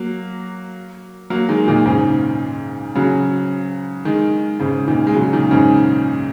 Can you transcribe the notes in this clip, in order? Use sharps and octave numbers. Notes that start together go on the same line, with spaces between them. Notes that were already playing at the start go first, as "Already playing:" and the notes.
Already playing: F#3 A#3
F#3 A#3
D#3 G#3
A#2 D#3
G#2 C#3
C#3 F#3
D#3 G#3
G#2 C#3
A#2 D#3
G#3
C#3 F#3
A#2 D#3
G#2 C#3